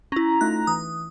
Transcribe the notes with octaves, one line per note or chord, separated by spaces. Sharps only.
C#4 E4 A#5
A3 D#4 F4 F#6
E3 D#6